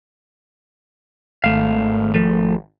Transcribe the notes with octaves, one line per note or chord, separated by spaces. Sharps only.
G#1 A3 F5
F3 A3